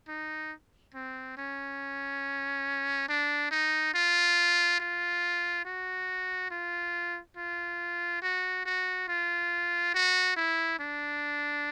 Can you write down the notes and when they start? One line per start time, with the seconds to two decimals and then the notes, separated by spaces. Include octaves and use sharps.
0.08 D#4
0.95 C4
1.37 C#4
3.09 D4
3.51 D#4
3.94 F4
4.80 F4
5.65 F#4
6.51 F4
7.37 F4
8.22 F#4
8.66 F#4
9.08 F4
9.94 F#4
10.37 E4
10.79 D4